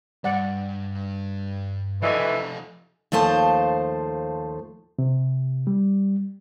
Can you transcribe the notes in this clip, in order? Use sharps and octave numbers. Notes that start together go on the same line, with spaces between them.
G2 D5 F#5
D2 E3 F3 A3 D5 D#5 G#5
D#2 F3 A3 C5 A5
C3
G3